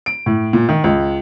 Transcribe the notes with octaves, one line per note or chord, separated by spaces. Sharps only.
D7
A2
A#2
D#3
C#2